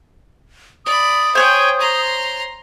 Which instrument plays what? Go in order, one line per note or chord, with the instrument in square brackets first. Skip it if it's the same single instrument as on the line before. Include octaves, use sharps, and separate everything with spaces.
[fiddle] D5 B5 [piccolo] D#6
[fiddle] G#4 G5 [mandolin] C5 C#5 G6
[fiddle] A#5 C6